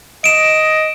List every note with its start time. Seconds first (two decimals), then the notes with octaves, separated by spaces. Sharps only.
0.24 D#5 D7 E7